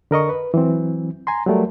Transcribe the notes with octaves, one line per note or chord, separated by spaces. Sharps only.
D3 A#4 D#5 C#6
B4
E3 F#3 C4
G#5 A#5 C6
F#3 G3 A3 A#4